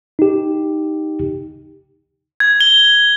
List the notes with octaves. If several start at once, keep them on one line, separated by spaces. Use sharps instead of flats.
D#4 G4
G#6
G7